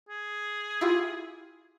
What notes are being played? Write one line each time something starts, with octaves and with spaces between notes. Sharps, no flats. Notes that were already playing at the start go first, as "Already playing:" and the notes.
G#4
E4 F4 G4